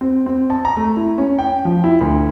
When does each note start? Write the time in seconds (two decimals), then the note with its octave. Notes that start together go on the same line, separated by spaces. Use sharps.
0.01 C4
0.26 C4
0.50 A5
0.65 A#5
0.77 A3
0.97 E4
1.18 C#4
1.38 G5
1.65 F3
1.84 E4
2.01 D2